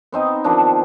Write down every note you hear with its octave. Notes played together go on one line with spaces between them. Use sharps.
B3 C4 D#4 D#5
D#3 F3 D4